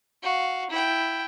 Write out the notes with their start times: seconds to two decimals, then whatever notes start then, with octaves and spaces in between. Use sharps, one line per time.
0.23 F#4 F5
0.71 E4 G5